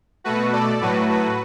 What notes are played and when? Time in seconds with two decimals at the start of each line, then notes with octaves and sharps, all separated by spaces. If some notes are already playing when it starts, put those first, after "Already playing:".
0.24 B2 A3 F#4 B4
0.52 A4 D5
0.81 A2 F#3 A3 F#4 B4
1.09 F#4 B4